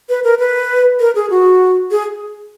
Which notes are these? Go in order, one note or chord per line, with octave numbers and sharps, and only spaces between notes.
B4
A#4
B4
A#4
G#4
F#4
G#4